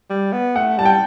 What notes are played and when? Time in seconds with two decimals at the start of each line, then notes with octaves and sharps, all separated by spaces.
0.10 G3
0.33 B3
0.56 A3 F#5
0.77 G3 A5
0.85 G5